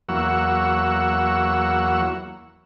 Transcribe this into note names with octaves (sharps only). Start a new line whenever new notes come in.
E2 F#3 A#3 F#5 C#6 E6